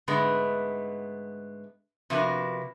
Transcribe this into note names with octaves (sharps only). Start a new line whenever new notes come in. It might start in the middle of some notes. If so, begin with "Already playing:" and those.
G#2 D3 G#3 A3 B3
C3 F3 A#3 B3 D4 F#4